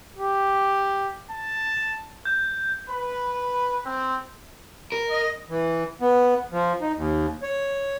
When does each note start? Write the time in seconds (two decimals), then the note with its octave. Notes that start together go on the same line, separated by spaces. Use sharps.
0.17 G4
1.31 A5
2.25 G6
2.89 B4
3.84 C4
4.92 A#4
5.09 D#5
5.49 E3
6.01 B3
6.52 F3
6.81 D#4
6.96 D#2
7.43 C#5